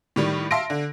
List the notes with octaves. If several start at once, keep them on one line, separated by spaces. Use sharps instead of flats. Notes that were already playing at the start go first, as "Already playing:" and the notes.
A2 D#3 G3
E5 F5 A5 C6 A#6 D7
D3